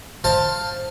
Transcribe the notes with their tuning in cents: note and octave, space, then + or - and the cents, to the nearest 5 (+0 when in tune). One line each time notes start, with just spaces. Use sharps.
C5 +15 F5 +5 A5 +15